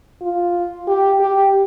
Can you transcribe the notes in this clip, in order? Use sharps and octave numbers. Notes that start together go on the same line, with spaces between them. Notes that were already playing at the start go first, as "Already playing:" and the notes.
F4
G4
G4